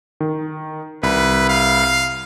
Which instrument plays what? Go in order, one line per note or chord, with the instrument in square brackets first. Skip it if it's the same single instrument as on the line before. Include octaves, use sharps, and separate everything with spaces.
[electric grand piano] D#3
[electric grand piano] C2 B5 B6 [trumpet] B4
[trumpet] F5
[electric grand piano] C7